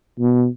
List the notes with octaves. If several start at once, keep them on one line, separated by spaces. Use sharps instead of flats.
B2